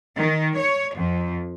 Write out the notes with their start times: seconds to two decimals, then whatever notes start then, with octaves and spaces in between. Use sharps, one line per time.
0.18 D#3
0.58 C#5
0.97 F2